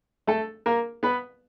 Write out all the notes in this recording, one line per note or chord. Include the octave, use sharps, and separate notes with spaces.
A3 A4
A#3 A#4
B3 B4